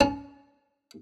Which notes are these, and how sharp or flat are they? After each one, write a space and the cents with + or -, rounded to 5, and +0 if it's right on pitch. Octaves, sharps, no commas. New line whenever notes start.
C#4 +20 A5 -40